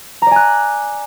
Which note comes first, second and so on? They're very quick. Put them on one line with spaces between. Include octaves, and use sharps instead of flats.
A#5 D5 G#5 F#6